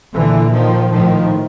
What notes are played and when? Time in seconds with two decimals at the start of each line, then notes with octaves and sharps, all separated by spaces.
0.13 A#2 D3 E3
0.51 D#3 F3
0.89 A2 D#3 F3